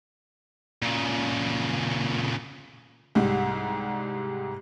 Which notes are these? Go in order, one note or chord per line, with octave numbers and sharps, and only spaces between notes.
A#2 C#3
C2 G#2 G3